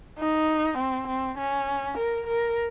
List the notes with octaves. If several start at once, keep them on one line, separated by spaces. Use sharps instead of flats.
D#4
C4
C4
C#4
A#4
A#4